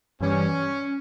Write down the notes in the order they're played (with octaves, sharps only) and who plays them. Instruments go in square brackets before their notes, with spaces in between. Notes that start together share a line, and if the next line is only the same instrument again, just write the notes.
[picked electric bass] G2 E3 G3 [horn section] C#4